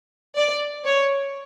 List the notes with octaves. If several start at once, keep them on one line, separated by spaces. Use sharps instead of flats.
D5
C#5